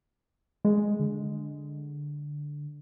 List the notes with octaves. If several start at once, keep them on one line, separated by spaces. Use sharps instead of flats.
G#3
D3